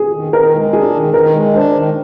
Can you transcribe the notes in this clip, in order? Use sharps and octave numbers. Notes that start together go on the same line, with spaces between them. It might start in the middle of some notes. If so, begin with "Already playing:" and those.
Already playing: G#4
D#3
D#3 A#4
G#3
D4 G#4
D#3
D#3 A#4
G#3
D4 C5
D#3